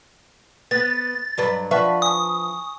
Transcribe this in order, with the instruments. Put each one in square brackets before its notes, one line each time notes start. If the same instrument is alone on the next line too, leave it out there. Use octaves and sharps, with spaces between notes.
[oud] B3 [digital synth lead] A6
[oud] G2 F#3 B4
[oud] F3 B4 E5 [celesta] D5 F#5 C#6
[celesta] G#5 C#6 [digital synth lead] D#6